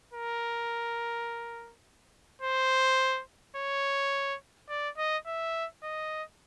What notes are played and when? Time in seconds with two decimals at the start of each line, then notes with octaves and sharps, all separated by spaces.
0.13 A#4
2.42 C5
3.56 C#5
4.69 D5
4.97 D#5
5.26 E5
5.83 D#5